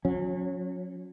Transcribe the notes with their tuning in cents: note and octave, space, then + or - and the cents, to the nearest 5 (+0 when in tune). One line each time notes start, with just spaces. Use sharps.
F#3 -35 C#4 +0